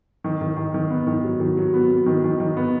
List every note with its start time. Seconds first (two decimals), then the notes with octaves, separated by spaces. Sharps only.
0.24 D#3
0.41 D#3
0.57 D#3
0.74 D#3
0.90 B3
1.07 D#3
1.24 F#3
1.40 D#3
1.57 F#3
1.74 B3
1.90 B3
2.06 D#3
2.24 D#3
2.40 D#3
2.57 B3